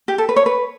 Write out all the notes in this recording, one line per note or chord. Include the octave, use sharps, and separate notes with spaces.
G4
A4
B4
C#5
B4